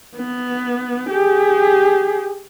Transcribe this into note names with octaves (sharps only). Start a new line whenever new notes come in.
B3
G4 G#4